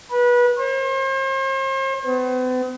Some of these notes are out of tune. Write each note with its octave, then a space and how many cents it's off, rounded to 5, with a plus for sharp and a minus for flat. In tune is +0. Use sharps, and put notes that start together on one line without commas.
B4 -25
C5 +40
B3 +45